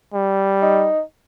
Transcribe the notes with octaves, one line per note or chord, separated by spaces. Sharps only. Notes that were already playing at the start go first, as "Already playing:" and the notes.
G3
D#4